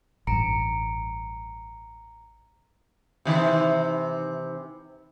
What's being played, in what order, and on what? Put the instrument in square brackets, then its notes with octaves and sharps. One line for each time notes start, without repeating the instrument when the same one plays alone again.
[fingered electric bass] A1 G2 [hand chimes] A#5 C#7 D7
[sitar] C3 D#3 E3